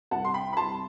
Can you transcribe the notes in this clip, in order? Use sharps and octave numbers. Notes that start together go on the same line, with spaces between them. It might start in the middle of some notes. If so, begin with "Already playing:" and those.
C2 F#5 A5
C6
G5 B5
B5
C2 A5 C6